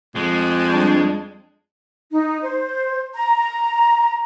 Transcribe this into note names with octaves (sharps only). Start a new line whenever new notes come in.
F2 G#3
G3 D4
D#4
C5
A#5
A#5